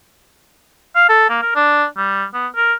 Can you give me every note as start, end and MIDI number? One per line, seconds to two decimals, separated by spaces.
0.96 1.09 77
1.09 1.29 69
1.30 1.41 58
1.42 1.54 70
1.56 1.86 62
1.97 2.25 55
2.34 2.48 59
2.56 2.74 70